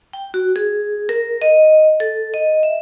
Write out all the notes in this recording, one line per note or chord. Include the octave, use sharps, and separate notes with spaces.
G5
F#4
G#4
A#4
D#5
A4
D#5
E5